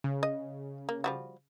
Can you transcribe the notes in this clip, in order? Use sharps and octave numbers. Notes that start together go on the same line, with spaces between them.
C#3
D#5
A#3
F3 G3 F#4